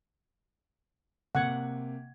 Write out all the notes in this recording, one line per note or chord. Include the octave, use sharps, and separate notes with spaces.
C3 A#3 F#5 G#6